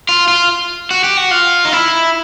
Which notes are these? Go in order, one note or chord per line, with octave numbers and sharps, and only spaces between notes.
F4
F4
F#4
G4
F#4
F4
D#4
E4